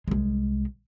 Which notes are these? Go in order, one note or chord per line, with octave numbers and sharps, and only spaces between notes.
C2 G#3